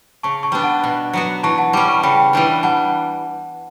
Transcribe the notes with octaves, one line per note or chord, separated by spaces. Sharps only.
C#3 A5 C#6
A5 C#6
G3 B3 D4
F#5 A5
B2
F#3 B3 F#4
E3 A5 C#6
F#5 A5
G3 C#4 B5 D6
A5 C#6
C#3 G5 B5
E3 G3 D4
G3 F#5 A5